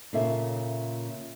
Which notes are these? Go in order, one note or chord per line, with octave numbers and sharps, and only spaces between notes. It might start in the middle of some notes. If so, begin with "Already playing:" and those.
A#2 C#3 A4 E5